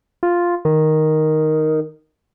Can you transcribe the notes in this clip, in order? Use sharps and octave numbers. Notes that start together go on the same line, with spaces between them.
F4
D#3